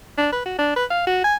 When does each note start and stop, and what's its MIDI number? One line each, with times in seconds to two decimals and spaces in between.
0.18 0.30 62
0.32 0.42 71
0.46 0.57 66
0.58 0.75 62
0.76 0.85 71
0.90 1.05 77
1.07 1.23 66
1.24 1.36 80